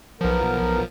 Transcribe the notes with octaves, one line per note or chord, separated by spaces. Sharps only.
B1 F3 B3 A#4